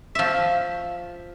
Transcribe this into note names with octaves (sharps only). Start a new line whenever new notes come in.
F3 E5